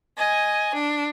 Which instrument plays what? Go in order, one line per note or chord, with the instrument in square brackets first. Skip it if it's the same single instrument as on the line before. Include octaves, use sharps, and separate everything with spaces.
[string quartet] D#5 [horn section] G#5
[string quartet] D4